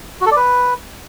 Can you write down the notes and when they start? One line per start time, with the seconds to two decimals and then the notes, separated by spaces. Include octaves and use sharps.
0.21 F#4
0.26 A4
0.31 D5
0.37 B4